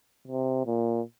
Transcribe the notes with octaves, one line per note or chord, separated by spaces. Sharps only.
C3
A#2